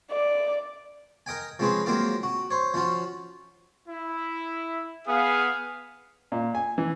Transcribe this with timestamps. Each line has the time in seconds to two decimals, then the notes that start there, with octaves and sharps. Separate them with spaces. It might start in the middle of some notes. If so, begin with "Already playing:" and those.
0.11 D5
1.26 A#4 D#5 G5 G#5
1.59 F3 G#3 C4 C#4 G#4 B4
1.86 F#3 G#3 A#3 C4 F4 C5
2.23 F#4
2.51 C5 C#5
2.74 F3 C#4 F4 F#4
3.88 E4
5.08 B3 G#4 F5
6.32 A#2
6.55 G#5
6.78 E3